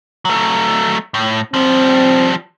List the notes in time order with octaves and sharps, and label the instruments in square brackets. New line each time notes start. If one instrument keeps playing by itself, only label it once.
[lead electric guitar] F#3 A3
A2
[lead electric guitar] F3 G3 [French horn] C4